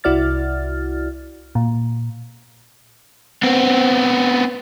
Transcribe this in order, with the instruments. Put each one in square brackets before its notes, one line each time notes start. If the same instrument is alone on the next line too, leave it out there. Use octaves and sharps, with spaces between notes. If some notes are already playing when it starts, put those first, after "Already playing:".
[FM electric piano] C2 E4 F#4 D5 F6 A6
A#2
[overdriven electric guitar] B3 C4